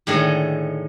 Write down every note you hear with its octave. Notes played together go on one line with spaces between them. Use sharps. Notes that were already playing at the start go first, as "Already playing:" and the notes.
A2 D3 D#3 G#4 D#5